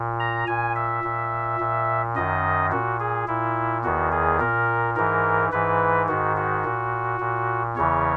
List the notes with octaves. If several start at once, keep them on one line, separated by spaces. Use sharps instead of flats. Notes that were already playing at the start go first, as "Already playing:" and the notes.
Already playing: A#2
A#5
A#2 G#5
E5
A#2
A#2
F#2 D#3 D#5
A#2 F#4
G#4
A#2 E4
E2 D#3 F#4
G#4
A#2 A#4
G#2 E3 A#4
G#2 E3 B4
G#2 D#3 F#4
F#4
A#2
A#2
E2 C#3 E3 C#5